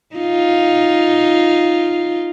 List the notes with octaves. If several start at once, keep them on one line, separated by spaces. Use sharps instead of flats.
D#4 F4